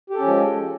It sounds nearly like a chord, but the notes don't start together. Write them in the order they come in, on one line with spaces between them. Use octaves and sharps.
G4 A4 C#4 F3 G#3